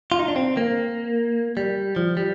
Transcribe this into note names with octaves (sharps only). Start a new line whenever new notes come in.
F4
D#4
D4
C4
A#3
G3
F3
G3